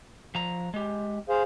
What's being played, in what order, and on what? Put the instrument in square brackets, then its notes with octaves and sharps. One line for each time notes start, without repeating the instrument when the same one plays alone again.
[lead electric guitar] F3 A#5
G#3 G4
[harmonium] G#4 C5 F5